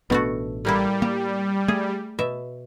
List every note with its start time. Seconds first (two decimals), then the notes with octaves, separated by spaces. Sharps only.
0.10 A1 B2 A3 B3 D4 F#4
0.65 A2 G3 A#3 E4
1.02 A#3 G4
1.68 A3 G#4
2.19 B2 E5